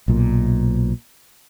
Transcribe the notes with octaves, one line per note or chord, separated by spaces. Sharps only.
B1 A#2